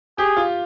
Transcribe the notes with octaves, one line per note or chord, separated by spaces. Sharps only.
G4 G#4
F4